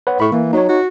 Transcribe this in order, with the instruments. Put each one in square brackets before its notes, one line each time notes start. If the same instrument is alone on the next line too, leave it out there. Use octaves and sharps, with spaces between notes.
[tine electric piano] B4 C#5 F#5
[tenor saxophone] A2 [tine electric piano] B5 C#6
[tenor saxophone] E3 [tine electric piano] A#3
[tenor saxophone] F#3 [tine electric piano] D#4 C#5
[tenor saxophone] F#4